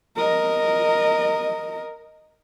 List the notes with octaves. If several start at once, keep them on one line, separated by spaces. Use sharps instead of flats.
A#4 D#5